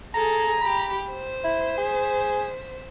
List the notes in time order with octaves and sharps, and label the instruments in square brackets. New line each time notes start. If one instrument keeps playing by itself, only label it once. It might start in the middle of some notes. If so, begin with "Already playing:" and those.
[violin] G#4 A4 [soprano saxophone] A#5
[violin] G4 B5
C5 B6
[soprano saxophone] E4
G#4